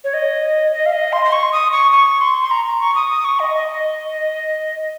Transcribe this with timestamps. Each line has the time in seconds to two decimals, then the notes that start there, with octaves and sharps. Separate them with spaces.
0.04 C#5
0.14 D#5
0.73 D#5
0.86 F5
0.93 D#5
1.13 C6
1.25 C6
1.32 C#6
1.52 D#6
1.72 C#6
1.92 C#6
2.21 C6
2.41 C6
2.51 A#5
2.65 A#5
2.80 C#6
2.95 D#6
3.10 D#6
3.25 C#6
3.39 D#5
3.55 D#5